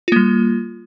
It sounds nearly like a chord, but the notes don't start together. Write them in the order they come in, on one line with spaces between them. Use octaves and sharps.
F4 A#3 G3